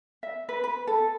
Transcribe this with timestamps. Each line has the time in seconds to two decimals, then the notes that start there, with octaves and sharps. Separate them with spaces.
0.23 E5
0.49 B4
0.64 B4
0.87 A4